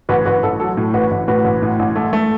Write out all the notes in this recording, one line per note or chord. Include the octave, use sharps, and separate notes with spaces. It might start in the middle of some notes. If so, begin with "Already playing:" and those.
A1 F#4 B4
A1 F#4 B4
A1 A4
F#3 A4
A2
A1 F#4 B4
A1
A2 F#4 B4
A1
A2
A1
A3
A3